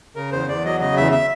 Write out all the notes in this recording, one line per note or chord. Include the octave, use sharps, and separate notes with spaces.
C#3 A#4
E2 C5
E2 D5
F#3 D#5
C#3 D#5
E2 E5
E5